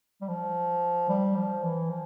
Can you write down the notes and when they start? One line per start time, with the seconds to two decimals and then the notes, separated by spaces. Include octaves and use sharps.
0.21 G3
0.28 F3
1.09 G3
1.35 F3
1.63 E3
1.90 F3